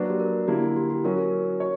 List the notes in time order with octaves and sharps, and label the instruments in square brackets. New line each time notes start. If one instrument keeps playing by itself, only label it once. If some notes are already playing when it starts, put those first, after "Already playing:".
Already playing: [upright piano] F#3 A#3 D4 F#4 [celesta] B4
[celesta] G4
A#4
[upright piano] D3 A#3 E4 [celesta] G4
[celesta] G4
G4
[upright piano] F#3 C#4 F#4 [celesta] A#4
[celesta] A#4
[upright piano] C#5